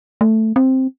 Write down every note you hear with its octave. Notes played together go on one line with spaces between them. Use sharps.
A3
C4